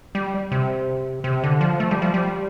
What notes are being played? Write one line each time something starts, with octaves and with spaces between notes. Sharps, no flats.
G3
C3
C3
D3
F3
A3
G3
F3
G3